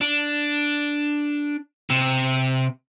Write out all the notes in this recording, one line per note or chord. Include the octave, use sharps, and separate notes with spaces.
D4
C3